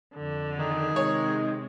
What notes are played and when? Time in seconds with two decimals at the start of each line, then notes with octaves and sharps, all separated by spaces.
0.13 F2 D3
0.59 D#3 G#4
0.96 C3 G#3 C#5